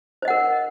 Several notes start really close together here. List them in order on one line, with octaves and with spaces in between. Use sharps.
C5 D#5 F#5 A#4